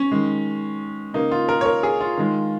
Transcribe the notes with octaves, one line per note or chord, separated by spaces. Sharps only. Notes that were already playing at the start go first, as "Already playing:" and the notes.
Already playing: C#4
D#3 G#3
C#3 A#3 D#4
F4
A#4
C#5
A#4
G#4
F4
D#3 G#3